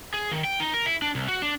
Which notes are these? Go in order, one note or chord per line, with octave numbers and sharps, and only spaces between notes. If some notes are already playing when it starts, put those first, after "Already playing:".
G#4
D#3
G5
D#4
A#4
E4
D4
C2
F#4
D4